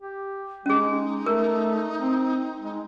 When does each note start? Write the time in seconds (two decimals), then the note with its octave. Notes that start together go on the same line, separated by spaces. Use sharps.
0.02 G4
0.66 G#3 C#4 D#4 G#4
1.26 A3 A#4
1.98 C4
2.60 G#3